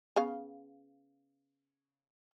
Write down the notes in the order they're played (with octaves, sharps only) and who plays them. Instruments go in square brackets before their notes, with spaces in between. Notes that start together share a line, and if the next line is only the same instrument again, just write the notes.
[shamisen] C#3 B3 F5